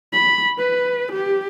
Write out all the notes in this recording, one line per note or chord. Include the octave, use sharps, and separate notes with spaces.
B5
B4
G4